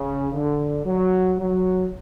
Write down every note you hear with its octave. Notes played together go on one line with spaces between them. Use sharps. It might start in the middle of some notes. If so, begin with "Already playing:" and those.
Already playing: C#3
D3
F#3
F#3